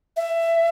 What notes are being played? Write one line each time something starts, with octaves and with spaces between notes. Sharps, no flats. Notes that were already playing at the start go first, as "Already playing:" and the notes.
E5